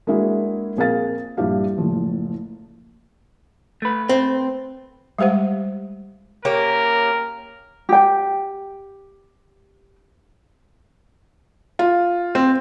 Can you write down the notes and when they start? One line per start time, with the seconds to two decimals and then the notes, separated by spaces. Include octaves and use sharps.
0.07 G#3 A#3 D4 E4 F#4 G#4
0.76 A#1 C4 G#4 A#4 F5 A6
1.37 A#1 G2 E4 G4 F5
1.78 F#1 A2 F3
3.82 A3 B4
4.09 C4
5.19 G3 G#3 G4 C5 F#5
6.45 A#3 C#4 G4 A#4
7.89 G4 G5
11.79 F4
12.35 C4